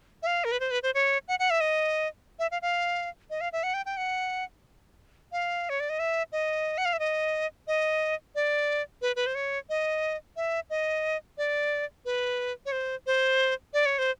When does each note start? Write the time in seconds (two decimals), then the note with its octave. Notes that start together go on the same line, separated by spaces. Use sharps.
0.23 E5
0.27 F5
0.44 A#4
0.52 B4
0.60 C5
0.71 B4
0.83 C5
0.94 C#5
1.28 F#5
1.39 F#5
1.50 E5
1.61 D#5
2.39 E5
2.51 F5
2.62 F5
3.30 D#5
3.41 F5
3.53 E5
3.63 F#5
3.74 G5
3.86 G5
3.97 F#5
5.32 F5
5.69 C#5
5.80 D5
5.90 D#5
5.99 E5
6.32 D#5
6.78 F#5
6.85 F5
6.93 E5
6.99 D#5
7.67 D#5
8.35 D5
9.02 B4
9.16 B4
9.27 C5
9.35 C#5
9.69 D#5
10.36 E5
10.70 D#5
11.38 D5
12.05 B4
12.66 C#5
12.72 C5
13.07 C5
13.74 D5
13.86 C#5
13.98 C5